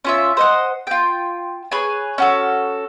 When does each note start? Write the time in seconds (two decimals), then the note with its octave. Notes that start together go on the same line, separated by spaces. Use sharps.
0.05 C#4 F4 E5
0.37 C5 D#5 F#5
0.87 F4 G5
1.71 G#4 B4 C#5 G#5
2.18 C#4 F#4 A4